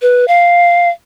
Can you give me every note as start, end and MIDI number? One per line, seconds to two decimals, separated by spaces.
0.02 0.25 71
0.28 0.89 77